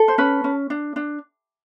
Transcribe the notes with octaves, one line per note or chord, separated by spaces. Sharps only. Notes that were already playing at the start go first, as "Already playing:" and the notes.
Already playing: A4
C5
C#4 B4
C#4
D4
D4